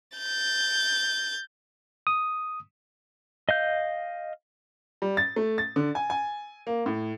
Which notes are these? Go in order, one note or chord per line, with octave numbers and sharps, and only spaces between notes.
G6 A6
D#6
D#5 F5 G6
G3
A6
A3
A6
D3
G#5
G#5
A#3
A2